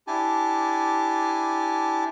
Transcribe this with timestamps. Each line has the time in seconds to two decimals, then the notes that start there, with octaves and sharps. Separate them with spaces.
0.07 D4 E4 G4 G#5 A5